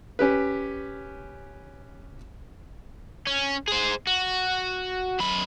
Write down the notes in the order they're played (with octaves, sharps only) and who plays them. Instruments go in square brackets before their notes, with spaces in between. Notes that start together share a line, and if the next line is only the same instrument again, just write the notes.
[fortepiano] C#4 G4 B4
[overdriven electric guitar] C#4
G#4 C5
F#4
F#2 B5